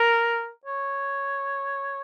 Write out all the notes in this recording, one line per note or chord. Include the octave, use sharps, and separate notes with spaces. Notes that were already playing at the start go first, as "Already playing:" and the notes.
Already playing: A#4
C#5